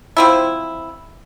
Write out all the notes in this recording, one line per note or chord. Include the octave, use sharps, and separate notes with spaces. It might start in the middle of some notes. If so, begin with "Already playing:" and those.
F3 C4 E4